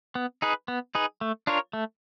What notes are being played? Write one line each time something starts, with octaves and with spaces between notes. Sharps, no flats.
B3
D#4 G#4 B4
B3
D#4 G#4 B4
A3
D4 F4 A#4 C#5
A3